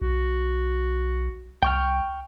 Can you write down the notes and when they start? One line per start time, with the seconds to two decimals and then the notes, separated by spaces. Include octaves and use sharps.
0.02 B1 F#4
1.63 C2 G5 C#6 F6